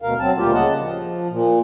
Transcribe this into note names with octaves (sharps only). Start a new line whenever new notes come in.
D2 B2 A#4 F5
F#3 C4 A5
D2 A#2 G3 A#3 F4 G4
C#3 D#5 F#5 A5
F3
A#2